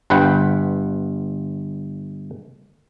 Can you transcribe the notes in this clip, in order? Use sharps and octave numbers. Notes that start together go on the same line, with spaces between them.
G1 G2 B4 F#5 G5